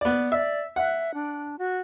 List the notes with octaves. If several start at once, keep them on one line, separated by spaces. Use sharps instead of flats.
B3 D5
D5 E5
E5 F#5
D4
F#4